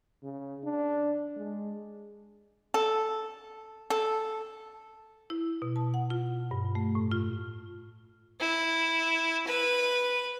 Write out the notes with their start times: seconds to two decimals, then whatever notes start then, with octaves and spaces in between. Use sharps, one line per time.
0.23 C#3
0.64 D4
1.36 G#3
2.74 A4
3.90 A4
5.30 E4
5.62 B2
5.76 A5
5.94 F#5
6.10 F4
6.51 G2
6.75 A3
6.95 A2
7.12 F4
8.40 E4
9.47 B4